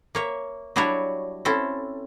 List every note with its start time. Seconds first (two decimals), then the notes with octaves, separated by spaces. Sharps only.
0.15 A#3 C#5 E5
0.76 F#3 G3 D4 E4 F#4 C#5
1.45 C4 C#4 E4 A4